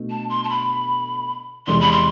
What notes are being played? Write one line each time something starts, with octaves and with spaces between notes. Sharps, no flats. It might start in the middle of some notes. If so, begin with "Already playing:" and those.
Already playing: B2 A3 D4
A5
C6
A5
B5
E2 C3 G#3 C6
B5
C6